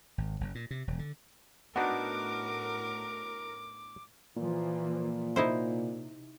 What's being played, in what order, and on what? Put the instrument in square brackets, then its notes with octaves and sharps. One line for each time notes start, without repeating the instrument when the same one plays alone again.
[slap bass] G#1
F#1
A#2
C3
E1
D3
[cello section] A2 A#4 [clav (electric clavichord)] B3 D4 D#4 [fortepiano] F#4 [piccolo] D6
[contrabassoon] A#2 [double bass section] E3 F3 A#3
[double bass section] C3 [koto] D#4 E4 C5